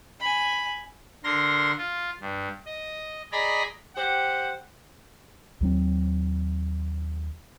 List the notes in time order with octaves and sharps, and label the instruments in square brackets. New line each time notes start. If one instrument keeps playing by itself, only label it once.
[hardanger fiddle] G#5 B5
[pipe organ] D3 A#4 C6 A#6
F4
G2
D#5
G#4 D5 D#5 G#5 A#5 B5
[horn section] G4 C5 F#5
[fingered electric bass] D#2 F#3 C4